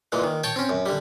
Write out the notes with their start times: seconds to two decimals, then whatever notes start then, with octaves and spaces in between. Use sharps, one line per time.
0.12 A#2 E3 G#3
0.24 D#3
0.44 C#5 G5 A5 C#6
0.56 C4 C#4
0.69 F#2
0.86 D3 G3